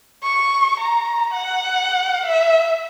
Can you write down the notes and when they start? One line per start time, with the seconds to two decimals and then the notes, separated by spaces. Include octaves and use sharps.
0.23 C#6
0.80 A#5
1.33 F#5
2.26 E5